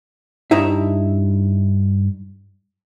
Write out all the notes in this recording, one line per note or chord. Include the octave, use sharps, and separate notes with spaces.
G2 D#4 E4 E5